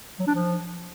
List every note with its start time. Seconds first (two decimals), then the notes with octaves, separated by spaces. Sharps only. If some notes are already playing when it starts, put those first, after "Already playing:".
0.20 F#3
0.27 D4
0.35 F3